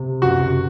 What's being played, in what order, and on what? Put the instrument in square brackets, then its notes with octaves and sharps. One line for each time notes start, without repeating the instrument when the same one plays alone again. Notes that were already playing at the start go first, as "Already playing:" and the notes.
Already playing: [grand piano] C3
[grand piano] F#1 [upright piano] F#4